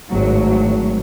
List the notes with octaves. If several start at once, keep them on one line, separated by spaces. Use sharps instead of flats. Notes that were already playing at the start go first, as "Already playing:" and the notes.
G#1 A2 F#3